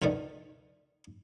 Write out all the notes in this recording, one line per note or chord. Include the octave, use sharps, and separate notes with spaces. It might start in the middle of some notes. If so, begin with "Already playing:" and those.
C#2 B2 D3 D#3 A3